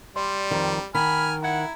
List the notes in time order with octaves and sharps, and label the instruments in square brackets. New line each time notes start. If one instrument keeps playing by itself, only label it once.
[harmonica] G3 [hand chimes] D5 C6
[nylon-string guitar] F2 D#3
[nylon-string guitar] D#3 [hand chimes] F#5 [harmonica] G#5 F6 [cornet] B5
[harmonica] E4 [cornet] F#5 [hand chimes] A#5 G#6